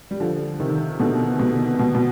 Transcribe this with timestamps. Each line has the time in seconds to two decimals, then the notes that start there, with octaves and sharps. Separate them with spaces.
0.11 G3
0.20 D3 F3
0.60 C3 D#3
0.99 B2 D3
1.39 B2
1.79 B2
1.95 B2